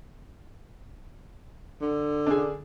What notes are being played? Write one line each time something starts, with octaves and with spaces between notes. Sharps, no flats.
D3
D4 G#4